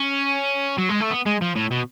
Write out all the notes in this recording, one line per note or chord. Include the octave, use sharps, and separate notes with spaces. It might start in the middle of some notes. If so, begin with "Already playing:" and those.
Already playing: C#4
F#3
G#3
A3
B3
G#3
F3
A2
B2